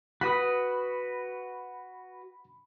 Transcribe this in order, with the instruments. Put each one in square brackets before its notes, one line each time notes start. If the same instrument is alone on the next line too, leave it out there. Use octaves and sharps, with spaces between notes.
[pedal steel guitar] F#4 B4 D#6 [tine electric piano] B5